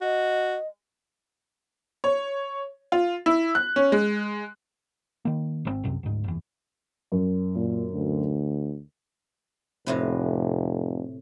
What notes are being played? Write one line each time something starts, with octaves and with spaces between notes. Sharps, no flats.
F#4 D#5
C#5
F4
E4
F#6
C#4
G#3
D#3 A#3
G#1 D3 C4
C2 F#2 C3
D2 G#2
F#1 E2
F#2
A#2
D2
F1 A2 C3 B4